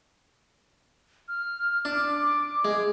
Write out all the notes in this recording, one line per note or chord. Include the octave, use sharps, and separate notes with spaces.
F6
D4 D6
G#3